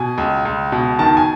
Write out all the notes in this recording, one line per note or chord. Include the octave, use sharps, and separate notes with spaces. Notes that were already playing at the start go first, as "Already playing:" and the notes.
Already playing: B2 G#5
C#2
C#2
B2
D#3 A5
G#5